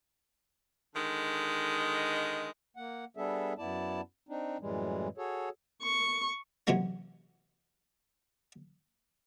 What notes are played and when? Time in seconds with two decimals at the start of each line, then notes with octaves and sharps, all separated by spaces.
0.96 D3 D#3 G#3
2.77 A#3 F#5
3.17 G3 B3 D4 G#4 A4 E5
3.58 F#2 B3 E4 D5 A5
4.29 C4 D4 D#4
4.61 F#2 A2 E3 G3 G#3
5.18 F#4 G#4 A4 C#5
5.82 C#6
6.67 C3 E3 F#3 G#3 A#3 C#4